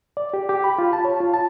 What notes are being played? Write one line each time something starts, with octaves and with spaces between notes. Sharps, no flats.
D5
G4
G4
B5
F4
A5
C#5
F4
A5